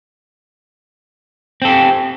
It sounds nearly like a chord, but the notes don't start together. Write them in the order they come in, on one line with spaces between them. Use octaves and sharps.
C4 A4 G4